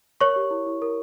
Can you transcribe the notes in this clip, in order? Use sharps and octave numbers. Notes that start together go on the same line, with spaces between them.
A#4 C#5 C#6
G4
E4
E4
A#4